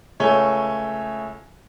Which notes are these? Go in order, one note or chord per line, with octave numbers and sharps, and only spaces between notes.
C#2 A3 C#5 G#5 G7